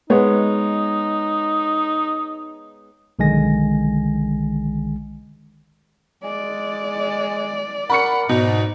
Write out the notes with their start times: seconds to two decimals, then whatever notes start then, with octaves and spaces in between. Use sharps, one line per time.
0.10 G#3 B3 D#4 C#5
3.19 B1 D3 D#3 G#3 G#5 A#6
6.24 G#3 D5
7.90 A#4 F#5 B5 C#6 C#7
8.29 G#2 B2 D#4